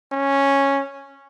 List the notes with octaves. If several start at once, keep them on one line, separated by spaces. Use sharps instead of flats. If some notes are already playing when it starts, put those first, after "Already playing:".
C#4